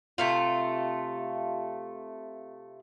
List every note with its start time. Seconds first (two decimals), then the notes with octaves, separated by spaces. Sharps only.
0.18 C3 A3 F4